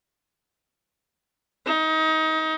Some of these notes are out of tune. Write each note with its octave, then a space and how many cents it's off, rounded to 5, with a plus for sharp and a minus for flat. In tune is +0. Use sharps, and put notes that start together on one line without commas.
D#4 +25